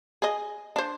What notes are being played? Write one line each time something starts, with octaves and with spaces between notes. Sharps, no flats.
G#4 D#5
D4 C5